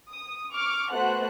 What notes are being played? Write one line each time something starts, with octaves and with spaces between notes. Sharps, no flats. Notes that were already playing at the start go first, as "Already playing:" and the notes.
D#6
C#6 D6 F6
A3 B3 F#4 C5 F#5 F#6